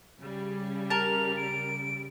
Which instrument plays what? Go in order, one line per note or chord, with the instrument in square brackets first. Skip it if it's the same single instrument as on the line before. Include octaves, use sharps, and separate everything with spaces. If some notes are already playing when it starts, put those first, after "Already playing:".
[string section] C#3 G3
[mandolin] A#4 A5 [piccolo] F7
[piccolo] D7